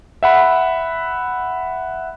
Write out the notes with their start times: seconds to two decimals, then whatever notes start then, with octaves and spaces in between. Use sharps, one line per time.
0.23 E5 F#5 B5